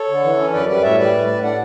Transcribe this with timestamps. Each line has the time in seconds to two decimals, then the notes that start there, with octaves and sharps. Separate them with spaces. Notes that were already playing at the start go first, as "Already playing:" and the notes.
Already playing: A4 C#5
0.09 D3
0.23 E3
0.38 C#4
0.53 F#2 B4 D5
0.69 G3 B4 D5
0.83 A2 C#5 E5
0.99 G3 B4 D5
1.14 A2
1.28 A2
1.43 D4 D5 F#5